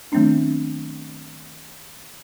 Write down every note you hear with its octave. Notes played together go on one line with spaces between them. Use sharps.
D#3 F#3 A3 B3 C4 D4